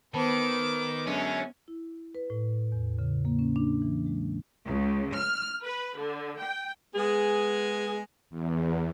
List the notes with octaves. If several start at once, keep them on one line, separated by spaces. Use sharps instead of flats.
D#3 B3 B4 C5 A5 D6
F#2 D3 G#3 C#4
E4
B4
A2
E2
C#3
A#3
C#4
D4
E3
G#3
C#2
F6
B4
D3
G5
G#3 B3 G#4
E2